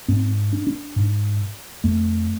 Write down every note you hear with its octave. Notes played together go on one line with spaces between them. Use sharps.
G#2 C4
D4
D4
G#2
F2 A3